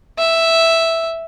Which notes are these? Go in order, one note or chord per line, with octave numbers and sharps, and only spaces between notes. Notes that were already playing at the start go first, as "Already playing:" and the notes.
E5